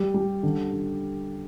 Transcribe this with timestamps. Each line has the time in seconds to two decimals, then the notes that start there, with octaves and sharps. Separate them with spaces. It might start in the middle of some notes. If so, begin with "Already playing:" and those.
Already playing: G3
0.14 G3
0.43 D3
0.72 D3